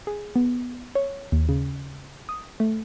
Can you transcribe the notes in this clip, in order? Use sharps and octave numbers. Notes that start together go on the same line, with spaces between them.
G#4
B3
C#5
D#2
C#3
D#6
A3